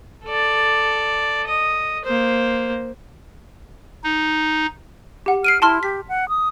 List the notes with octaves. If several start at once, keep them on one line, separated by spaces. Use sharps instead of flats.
A4 D5
D#5
A#3 C5
D#4
G4 F#5
F6 C7 D7 D#7
E4 A5 C6 F6
G4 B6
F#5
D#6